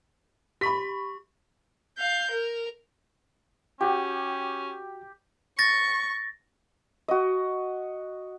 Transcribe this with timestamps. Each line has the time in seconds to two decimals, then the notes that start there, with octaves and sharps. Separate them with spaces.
0.61 G4 B5 C#6 B6
1.98 F5 G6
2.31 A#4
3.81 C#4 F#4 G4 G5
5.59 C#6 A6 A#6
7.08 F#4 D#5